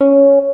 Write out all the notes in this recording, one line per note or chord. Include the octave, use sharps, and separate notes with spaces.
C#4